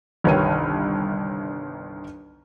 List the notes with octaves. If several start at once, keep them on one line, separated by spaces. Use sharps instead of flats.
G1 C2 D#3 B4 C#5 D#7